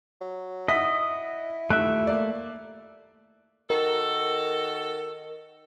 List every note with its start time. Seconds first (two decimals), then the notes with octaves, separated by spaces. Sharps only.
0.21 F#3
0.68 E4 D#5 E5 F#5 D#6 B6
1.70 D#1 A3 E5 F#6 D7
2.07 A#3 D5
3.70 D#3 F#4 A4 A#4